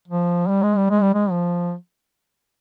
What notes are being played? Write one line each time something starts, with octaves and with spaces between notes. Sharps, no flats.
F3
G3
G#3
G3
G#3
G3
G#3
F3